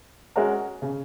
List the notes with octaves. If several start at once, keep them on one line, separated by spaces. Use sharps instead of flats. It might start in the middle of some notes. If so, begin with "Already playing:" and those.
G#3 C#4 F#4 A#4
C#3